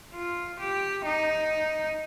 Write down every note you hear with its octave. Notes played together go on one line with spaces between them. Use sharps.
F4
G4
D#4